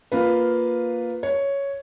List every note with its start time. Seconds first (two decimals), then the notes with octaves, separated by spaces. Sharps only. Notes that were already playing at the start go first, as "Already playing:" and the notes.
0.12 A#3 F4 B4
1.23 C#5